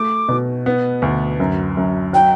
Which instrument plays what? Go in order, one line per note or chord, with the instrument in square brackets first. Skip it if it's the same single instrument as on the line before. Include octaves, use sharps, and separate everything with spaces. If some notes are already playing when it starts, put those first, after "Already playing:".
Already playing: [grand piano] A3 [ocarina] D6
[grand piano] B2
B3
D2
F#2
F#2
[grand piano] F#3 [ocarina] G5